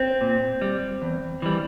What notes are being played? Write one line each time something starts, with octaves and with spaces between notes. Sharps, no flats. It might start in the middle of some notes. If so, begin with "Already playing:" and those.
Already playing: C4
A#2
G3
E2
E3 G3